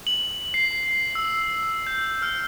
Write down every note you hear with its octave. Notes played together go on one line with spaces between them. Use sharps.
F#7
C7
E6
G6
F6